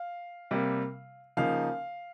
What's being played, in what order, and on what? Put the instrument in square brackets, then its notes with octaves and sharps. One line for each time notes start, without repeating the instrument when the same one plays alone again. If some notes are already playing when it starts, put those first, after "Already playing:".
Already playing: [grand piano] F5
C3 G3 A#3
C#3 F3 A#3 D#4 F5